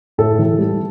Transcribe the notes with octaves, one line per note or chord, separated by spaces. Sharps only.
A2 A4
E3
G3